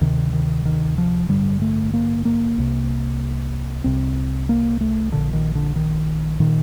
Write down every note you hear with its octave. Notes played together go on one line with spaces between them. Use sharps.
D2 C3 D#3
D#3
D#3
F3
A1 G2 D3 G3
A3
A#3
A#3
C2 C3
C2 C3 C4
A#3
A3
A#1 A#2 D3
D#3
D3
D#3
A#2 D#3